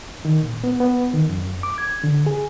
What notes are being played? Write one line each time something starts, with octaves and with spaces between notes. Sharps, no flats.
D#3
A#2
B3
B3
D#3
F#2
D6
G#6
D3
G#4